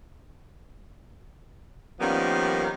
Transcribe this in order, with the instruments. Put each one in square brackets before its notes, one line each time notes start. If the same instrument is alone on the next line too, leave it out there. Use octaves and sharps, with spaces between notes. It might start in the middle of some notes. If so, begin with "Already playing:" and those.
[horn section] D#3 F3 G3 A#3 B3 C#4